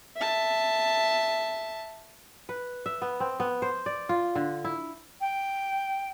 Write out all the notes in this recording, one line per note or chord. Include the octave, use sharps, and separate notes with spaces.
E5 A5
B4
E5
B3
C4
B3
C5
D5
F4
D3
E4
G5